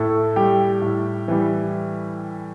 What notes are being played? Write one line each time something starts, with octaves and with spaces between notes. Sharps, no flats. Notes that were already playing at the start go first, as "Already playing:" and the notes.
Already playing: A2 A3 A4
G3 G4
A2
E3 G3